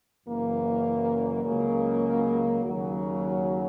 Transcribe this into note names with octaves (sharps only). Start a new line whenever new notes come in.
F#1 F#2 E3 A#3
C#2 C#3 F#3 A#3
D#2 C#3 F#3